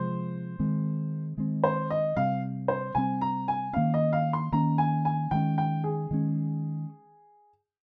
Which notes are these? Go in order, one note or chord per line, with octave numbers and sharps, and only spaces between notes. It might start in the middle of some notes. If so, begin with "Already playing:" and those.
Already playing: C3 F3 G#3 C5
D#3 G#3 C4
D#3 G#3 C4
C5
D#5
C3 G3 C4 F5
C5
C3 G3 C4 G#5
A#5
G#5
D#3 A#3 C#4 F5
D#5
F5
C6
D#3 A#3 C#4 A#5
G#5
G#5
D#3 G#3 C#4 G5
G5
G#4
D#3 G#3 C#4